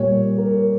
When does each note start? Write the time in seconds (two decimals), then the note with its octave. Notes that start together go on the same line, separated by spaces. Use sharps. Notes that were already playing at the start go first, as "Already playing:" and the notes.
Already playing: A#2 G3 A#3 C#5
0.38 A#4